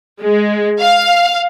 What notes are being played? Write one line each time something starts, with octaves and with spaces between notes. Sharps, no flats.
G#3
F5